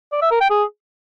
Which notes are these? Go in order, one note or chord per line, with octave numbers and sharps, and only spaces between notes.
D5
E5
A#4
G5
G#4